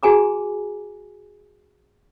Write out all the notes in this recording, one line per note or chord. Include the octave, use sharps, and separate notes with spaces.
F#4 G#4 G#5 A#5 D6